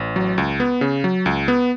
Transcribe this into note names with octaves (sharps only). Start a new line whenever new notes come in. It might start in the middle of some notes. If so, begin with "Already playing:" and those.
Already playing: A1
F#3
C#2
B3
C#3
F#3
C#2
B3